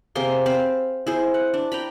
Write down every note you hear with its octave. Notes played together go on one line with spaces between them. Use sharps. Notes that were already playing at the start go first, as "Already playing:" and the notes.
C3 A#3 G#4 C6
C4 C5 F5 B5
E4 G#4 C5
F#5
D4
G5 A#5 B5